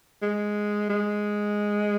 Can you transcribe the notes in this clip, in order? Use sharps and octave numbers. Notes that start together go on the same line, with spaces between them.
G#3
G#3